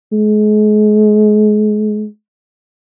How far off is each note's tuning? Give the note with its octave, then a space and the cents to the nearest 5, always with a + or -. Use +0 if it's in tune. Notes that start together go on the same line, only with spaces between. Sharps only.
G#3 +35